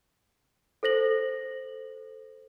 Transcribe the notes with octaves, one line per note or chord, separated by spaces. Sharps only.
A4 C5 A#6 F#7